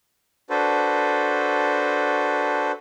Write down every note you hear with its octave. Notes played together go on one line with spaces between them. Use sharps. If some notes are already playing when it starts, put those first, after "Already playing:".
D4 F#4 A4 B4 C5